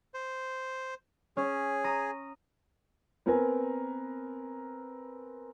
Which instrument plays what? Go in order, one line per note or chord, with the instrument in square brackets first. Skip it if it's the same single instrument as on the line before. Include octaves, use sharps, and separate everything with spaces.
[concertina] C5
[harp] C#4 [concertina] G#4
[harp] A#5 D#6
[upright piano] B3 C4 A#4 B4 G#5 A#5